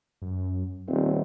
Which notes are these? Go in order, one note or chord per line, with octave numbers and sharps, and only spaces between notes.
F#2
D#1 C4